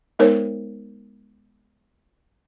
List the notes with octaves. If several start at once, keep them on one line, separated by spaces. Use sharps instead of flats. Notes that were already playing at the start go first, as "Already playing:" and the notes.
G#3 B3 D#4 A#4 C5 C#5